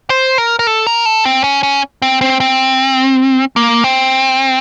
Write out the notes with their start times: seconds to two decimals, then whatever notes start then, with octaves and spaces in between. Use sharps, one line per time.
0.10 C5
0.38 A#4
0.59 A#4
0.67 A4
0.87 A#4
1.06 A4
1.25 C4
1.44 C#4
1.63 C#4
2.02 C4
2.21 C4
2.40 C4
3.56 A#3
3.84 C4